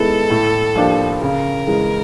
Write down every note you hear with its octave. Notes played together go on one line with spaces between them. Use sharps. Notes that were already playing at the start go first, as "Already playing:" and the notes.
Already playing: D#3 G#3 B3 E4 A4
A2
F3 A#3 D4 G4
C#3 A#4
E3 G#3